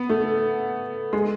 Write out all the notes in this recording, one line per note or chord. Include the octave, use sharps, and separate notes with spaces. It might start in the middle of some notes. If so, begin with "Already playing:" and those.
Already playing: B3
A3
G#3